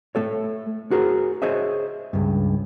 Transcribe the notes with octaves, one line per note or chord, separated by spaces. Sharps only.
A3 A4 C#5
F#4 G#4 A#4 C5
G#4 C5 C#5 D#5 E5
C#2 G2